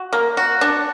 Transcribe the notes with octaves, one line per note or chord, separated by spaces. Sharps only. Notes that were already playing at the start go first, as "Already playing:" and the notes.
Already playing: F#4
A#3
F#4
D4